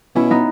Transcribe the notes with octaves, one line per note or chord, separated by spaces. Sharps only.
B2 C#4 E4
B3 D#4